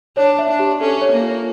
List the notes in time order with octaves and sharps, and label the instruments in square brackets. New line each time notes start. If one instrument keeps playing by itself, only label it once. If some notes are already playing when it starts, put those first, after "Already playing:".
[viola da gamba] D4 [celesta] C#5
[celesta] E5
[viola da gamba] D4
[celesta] G4
[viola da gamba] C#4 [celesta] A4
[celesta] C#5
[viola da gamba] A#3
[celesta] F4